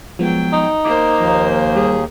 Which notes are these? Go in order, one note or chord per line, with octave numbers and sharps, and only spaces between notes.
F3 F#3 G#3 B3 G5
D#4
A#3 C5 D6
D#2 F3
G3 G#4